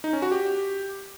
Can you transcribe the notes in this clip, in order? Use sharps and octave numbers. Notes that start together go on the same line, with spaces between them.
D#4
C#4
F#4
G4